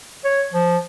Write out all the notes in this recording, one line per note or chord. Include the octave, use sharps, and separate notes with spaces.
C#5
F3